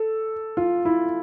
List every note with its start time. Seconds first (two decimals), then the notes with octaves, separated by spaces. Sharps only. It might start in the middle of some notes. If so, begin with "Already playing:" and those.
Already playing: A4
0.57 F4
0.85 E4